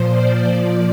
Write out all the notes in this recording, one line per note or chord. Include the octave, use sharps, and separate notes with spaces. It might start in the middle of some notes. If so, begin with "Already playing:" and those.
Already playing: A#2 F3 C5
D5
A#2 F3 D5